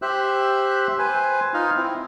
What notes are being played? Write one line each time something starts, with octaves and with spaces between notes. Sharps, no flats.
G4 C5 E5 E6 F#6
B4 C5 G#5
D#4 F4 D#5 F6
C4 E4